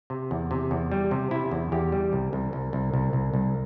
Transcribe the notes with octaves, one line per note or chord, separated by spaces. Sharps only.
C3
E2
C3
E2
G3
C3
C3 E4
E2
E2 G4
G3
C2
C2
C2
C2
C2
C2
C2